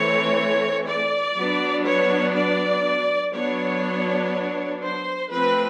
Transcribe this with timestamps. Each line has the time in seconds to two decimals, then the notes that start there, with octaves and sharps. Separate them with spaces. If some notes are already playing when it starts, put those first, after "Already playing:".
Already playing: E3 A3 C4 C#5
0.88 D5
1.37 F#3 B3 D4
1.86 C#5
2.35 D5
3.34 F#3 B3 D4 C#5
4.83 C5
5.31 F3 A3 C4 B4